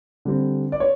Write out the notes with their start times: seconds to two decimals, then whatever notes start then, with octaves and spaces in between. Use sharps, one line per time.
0.25 D3 G3 C4
0.72 D5
0.80 C#5